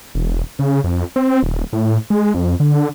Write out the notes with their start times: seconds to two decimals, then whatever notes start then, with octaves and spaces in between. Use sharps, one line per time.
0.15 E1
0.59 C#3
0.84 F2
1.16 C4
1.43 D#1
1.73 A2
2.10 G#3
2.34 F2
2.60 D3